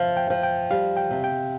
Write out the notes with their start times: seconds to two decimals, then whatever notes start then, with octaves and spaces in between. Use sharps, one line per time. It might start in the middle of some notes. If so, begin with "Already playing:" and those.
Already playing: F3 E5 F5
0.17 G5
0.30 F3
0.43 G5
0.71 G3 F5
0.97 G5
1.11 C3
1.24 G5